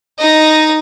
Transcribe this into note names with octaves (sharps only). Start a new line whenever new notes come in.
D#4 D#5